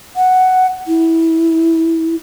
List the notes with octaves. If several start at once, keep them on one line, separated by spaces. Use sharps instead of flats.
F#5
E4